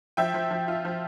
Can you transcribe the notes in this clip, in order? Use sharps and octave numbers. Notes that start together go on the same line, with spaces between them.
F3 E5 G5
F3
F3
F4
F3